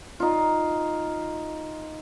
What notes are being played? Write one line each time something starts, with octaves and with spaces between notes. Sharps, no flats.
D#4 F4